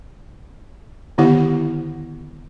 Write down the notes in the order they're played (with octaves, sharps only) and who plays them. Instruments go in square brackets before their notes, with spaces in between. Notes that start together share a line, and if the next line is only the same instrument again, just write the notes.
[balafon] D3 D#3 B3 E4 G4 F#5